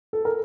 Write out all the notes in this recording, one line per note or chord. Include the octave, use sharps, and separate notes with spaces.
A4
A#4